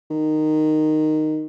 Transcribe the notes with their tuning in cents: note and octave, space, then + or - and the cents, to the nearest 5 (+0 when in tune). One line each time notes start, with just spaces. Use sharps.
D#3 -10